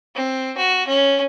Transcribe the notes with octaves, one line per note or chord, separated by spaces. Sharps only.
C4
F#4
C#4